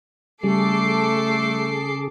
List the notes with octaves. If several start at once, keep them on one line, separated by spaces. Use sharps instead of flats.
C#3 G3 A3 G#4 A4 D6 C7